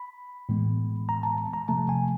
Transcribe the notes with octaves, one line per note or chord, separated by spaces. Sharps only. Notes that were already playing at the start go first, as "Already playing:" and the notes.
Already playing: B5
A2 E3 G#3 B3
A#5
A5
A#5
C3 F3 A3 A5
G#5